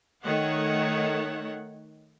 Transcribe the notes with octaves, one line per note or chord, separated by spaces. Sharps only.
D#3 A3 C#5 F#5